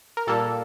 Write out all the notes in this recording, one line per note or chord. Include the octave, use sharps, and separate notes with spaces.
A#4
A#2 G3 A#3 A4